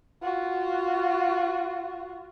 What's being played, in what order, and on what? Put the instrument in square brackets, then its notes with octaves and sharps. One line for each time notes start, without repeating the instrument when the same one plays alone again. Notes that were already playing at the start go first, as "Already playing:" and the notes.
[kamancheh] F4 F#4